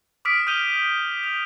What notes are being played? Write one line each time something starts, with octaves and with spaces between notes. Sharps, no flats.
D6 D#6 F6 B6 D7
D#6 F6 G6 D#7 F7 G7
F7